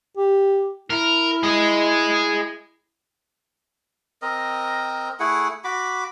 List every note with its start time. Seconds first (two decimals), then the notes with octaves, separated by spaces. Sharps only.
0.17 G4
0.90 E4 A#4
1.43 G#4 D#5
4.22 C4 A#4 D#5
5.20 A3 E4 G#4 F#5
5.64 F#4 B5 D6